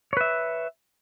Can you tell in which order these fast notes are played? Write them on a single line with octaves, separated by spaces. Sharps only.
C#5 B4 E5